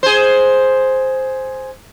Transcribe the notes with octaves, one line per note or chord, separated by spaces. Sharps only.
G#4 C5